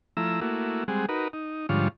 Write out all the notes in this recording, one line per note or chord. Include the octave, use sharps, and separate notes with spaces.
F3 A3 E4 A#5 E6
A3 A#3 E4 F#4
G3 G#3 C4 G#4 F#5
D#4 F#4 A#4 B4
D#4
G#2 D3 F3 G3 F4 C#5